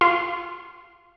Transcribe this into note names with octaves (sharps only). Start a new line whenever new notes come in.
F4